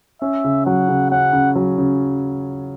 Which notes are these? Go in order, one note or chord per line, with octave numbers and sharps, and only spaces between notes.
C#4 E5
C#3
F#3 F#5
C#3
C#4 F#5
C#3
F#3
C#3